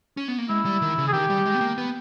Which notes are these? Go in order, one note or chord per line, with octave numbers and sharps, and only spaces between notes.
C#4
B3
A#3
G#3 E4
G3
D#3
C#3
G#4
D#3 G4
G3
G#3
B3
A#3
B3